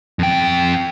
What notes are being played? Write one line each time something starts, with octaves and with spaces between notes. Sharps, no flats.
F2 G5